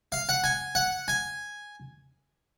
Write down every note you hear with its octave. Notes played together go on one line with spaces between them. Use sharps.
F5
F#5
G#5
F#5
G#5